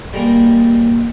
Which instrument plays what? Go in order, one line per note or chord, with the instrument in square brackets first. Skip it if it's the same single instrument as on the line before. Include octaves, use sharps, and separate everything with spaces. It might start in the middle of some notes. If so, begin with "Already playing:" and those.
[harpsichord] G3 G#3 A#3